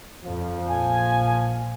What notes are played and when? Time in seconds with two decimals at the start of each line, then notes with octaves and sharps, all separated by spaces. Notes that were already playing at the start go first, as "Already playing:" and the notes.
0.25 F2 F3
0.68 A#1 G#5